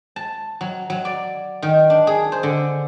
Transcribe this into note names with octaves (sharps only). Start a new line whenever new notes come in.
A5
F#3
F#3
D5
D#3
D4
G#4
C5
D3